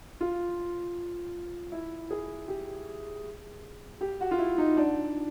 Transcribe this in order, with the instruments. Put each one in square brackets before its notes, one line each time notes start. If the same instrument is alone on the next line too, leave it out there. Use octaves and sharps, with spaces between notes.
[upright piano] F4
E4
G#4
G4
G4
F#4
F4
E4
D#4
D4